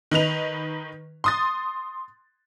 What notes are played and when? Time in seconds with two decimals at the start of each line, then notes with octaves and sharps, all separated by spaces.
0.11 D#3 D#4 B4 F7
1.24 C6 D#6 A6